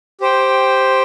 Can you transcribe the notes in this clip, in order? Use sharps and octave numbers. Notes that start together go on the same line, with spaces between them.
G4 C5 G5